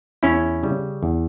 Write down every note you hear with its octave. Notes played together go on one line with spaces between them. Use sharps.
E2 C#4 E4
C#3 G3
E2